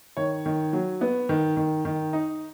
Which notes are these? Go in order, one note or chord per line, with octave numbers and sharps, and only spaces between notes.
D#3 C#5
D#3
F#3
B3
D#3
D#3
D#3
D#4